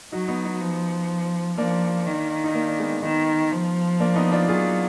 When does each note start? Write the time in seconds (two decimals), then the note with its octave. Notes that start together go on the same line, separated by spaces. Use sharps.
0.12 F#3 D#4 F#4
0.28 B3 D#4
0.44 B3 D#4
0.61 F3
1.58 F3 A#3 D4
2.06 D#3
2.44 D#4
2.54 A#3 D4
2.68 D4
2.79 G#3 B3
3.03 D#3 B3 D#4
3.52 F3
4.00 A#3 D4
4.16 B3 D#4
4.32 D4 F4
4.48 F#3 F4 G#4